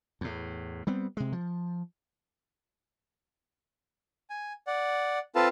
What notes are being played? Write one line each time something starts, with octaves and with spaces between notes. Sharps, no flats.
E2 A2
G3 B3 C4
C3 G#3
F3
G#5
D5 F#5
C4 F4 A4 B4 F5 A5